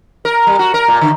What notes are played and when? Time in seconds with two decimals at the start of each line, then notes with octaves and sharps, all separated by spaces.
0.25 A#4
0.47 G3
0.59 F#4
0.74 A#4
0.88 A#2
1.01 D3